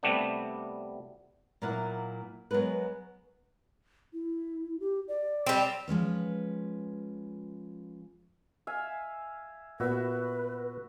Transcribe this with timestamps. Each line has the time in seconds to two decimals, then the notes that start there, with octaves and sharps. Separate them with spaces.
0.03 C3 G3 A3 B3 D4
1.62 A#2 F#3 A#3 E4 F#5
2.51 F#3 G#3 B3 A#4 B4
4.13 E4
4.80 G4
5.08 D5
5.46 G3 C4
5.88 F3 G#3 C#4 B4
8.67 E5 F5 G#5
9.80 A#2 B3 F#4 B4 E5